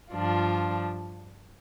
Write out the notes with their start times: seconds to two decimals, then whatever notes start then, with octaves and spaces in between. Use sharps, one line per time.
0.14 G2 F3 D4 F4